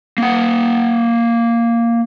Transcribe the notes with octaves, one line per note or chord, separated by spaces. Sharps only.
A#3 F#5